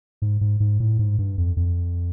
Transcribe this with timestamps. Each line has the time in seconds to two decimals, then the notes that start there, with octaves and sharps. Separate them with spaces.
0.22 G#2
0.41 G#2
0.60 G#2
0.80 A2
0.99 G#2
1.18 G2
1.38 F2
1.57 F2